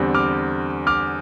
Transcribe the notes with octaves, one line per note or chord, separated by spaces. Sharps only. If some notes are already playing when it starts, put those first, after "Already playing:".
Already playing: E2 D3 G3 C4
D6 F6
D6 F6